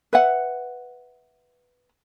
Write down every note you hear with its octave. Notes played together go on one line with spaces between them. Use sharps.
B4 E5 F#5